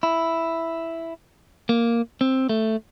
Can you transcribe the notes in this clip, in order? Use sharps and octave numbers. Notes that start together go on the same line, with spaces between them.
E4
A#3
C4
A3